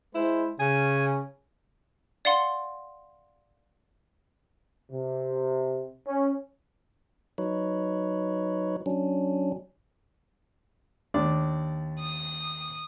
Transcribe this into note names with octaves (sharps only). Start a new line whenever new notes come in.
G#3 E4 C5
C#3 C#4 G#5
D5 F5 F#5 C6
C3
C#4
F#3 D#4 B4 C#5
F#3 C#4 D4
D#2 D4 D5
D#6